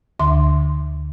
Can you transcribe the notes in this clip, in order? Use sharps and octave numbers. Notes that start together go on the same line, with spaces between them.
D2 D3 E5 C6 D6